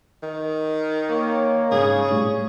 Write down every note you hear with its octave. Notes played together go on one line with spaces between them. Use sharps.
D#3
A#3 C#5
G#2 C#3 G#3 G#4
A2 G3